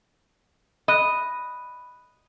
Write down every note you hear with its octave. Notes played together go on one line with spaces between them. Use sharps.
D#5 B5 F#6